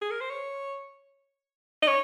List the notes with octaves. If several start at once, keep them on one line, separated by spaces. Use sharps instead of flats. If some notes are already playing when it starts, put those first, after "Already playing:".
G#4
A#4
C5
C#5
D#5
C#5